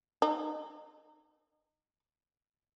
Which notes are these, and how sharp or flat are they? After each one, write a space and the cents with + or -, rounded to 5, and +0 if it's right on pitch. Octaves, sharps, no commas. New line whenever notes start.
D#4 -15